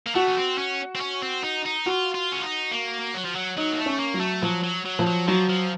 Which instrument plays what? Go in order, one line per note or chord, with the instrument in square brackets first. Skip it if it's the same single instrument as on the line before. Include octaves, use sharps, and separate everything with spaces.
[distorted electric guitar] A#3
[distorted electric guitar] A3 [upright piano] F#4
[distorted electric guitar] C#4
C4
C#4
C4
C#4
C4
D#4
D#4
[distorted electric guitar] F4 [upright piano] F#4
[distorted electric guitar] F4
C#4
D#4
A#3
F#3
F3
F#3
[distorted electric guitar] F#3 [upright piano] D#4
[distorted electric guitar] A#3
A3
[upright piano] C#4
[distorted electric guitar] A#3
[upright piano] F#3
[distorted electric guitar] A3
[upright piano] F3 [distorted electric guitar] F#3
[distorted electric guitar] F#3
F#3
[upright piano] F3
[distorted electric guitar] F#3
[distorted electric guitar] F3 [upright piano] F#3
[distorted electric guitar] F3